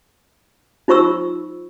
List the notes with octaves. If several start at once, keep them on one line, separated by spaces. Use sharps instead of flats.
D#4 F4 C5 C#6 E6